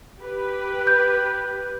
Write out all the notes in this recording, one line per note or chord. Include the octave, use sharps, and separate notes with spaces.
G4 B4
G6